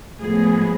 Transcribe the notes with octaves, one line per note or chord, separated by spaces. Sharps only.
A2 F3 G#3 B3 G#4